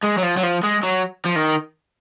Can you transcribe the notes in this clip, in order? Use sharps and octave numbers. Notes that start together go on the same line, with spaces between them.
G#3
F#3
F3
F#3
F3
G#3
F#3
F3
D#3